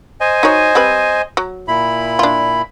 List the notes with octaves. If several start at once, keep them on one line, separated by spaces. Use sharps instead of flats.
C5 D#5 G#5
D#4 F#4 C#5
G3 C4 B4
F#3
A#2 E4 B5
D4 F4